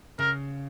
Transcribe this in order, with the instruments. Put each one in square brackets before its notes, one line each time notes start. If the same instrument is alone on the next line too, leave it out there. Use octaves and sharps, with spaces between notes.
[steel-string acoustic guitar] C#3 [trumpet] A#4